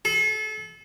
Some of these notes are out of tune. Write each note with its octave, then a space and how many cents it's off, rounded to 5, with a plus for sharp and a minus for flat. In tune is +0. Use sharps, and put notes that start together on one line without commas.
A4 -35